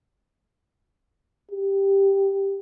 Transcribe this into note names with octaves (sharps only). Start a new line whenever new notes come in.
G4